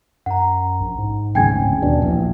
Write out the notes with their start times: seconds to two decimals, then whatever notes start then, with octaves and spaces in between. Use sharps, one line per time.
0.26 F#2 F#5 A#5
0.80 A#1
0.98 G#2
1.35 D1 G#1 C#3 G5 G#5 G#6
1.82 D#1 D#2 B2 D4
2.02 A#1 E3